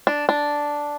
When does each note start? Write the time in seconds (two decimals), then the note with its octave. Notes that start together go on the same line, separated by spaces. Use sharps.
0.07 D4
0.29 D4